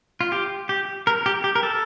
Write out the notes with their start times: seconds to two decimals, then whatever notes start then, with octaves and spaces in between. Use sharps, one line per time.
0.21 F4
0.32 G4
0.69 G4
1.07 A#4
1.26 G4
1.44 G4
1.55 A#4
1.63 A4